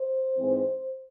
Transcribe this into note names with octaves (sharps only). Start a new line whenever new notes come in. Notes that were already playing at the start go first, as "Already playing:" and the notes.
Already playing: C5
G#2 E3 G#3 C4